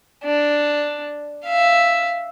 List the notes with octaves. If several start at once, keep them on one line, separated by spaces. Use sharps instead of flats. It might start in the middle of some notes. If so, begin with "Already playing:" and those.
D4
E5 F5